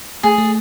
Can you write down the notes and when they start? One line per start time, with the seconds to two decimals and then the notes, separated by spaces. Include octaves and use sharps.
0.23 A3 G#4
0.38 A3